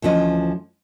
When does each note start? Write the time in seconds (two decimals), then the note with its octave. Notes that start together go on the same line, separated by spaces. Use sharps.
0.02 D2 E3 F3 C#4 D#5